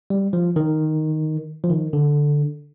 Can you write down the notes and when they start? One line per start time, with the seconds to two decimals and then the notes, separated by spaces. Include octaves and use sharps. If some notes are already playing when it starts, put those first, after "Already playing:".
0.10 G3
0.33 F3
0.56 D#3
1.64 F3
1.70 D#3
1.93 D3